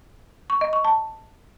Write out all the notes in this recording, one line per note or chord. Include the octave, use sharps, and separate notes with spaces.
C#6
D#5
C#6
A5